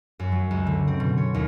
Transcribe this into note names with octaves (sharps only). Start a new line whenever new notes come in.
F#2
F#3
C#2
D3
C4
B2
C#5
D#2